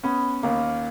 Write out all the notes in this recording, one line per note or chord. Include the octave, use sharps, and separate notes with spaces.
B3 C#4
D#2 A#3